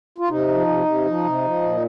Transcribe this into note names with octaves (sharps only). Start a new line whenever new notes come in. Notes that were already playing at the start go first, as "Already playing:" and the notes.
F4
C3 D#4
F3
C3
C3
F3
C3
F3
A#2